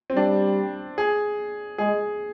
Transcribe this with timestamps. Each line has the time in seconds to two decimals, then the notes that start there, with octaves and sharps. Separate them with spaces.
0.10 C4
0.16 G3 D4
0.98 G#4
1.78 G#3 G#4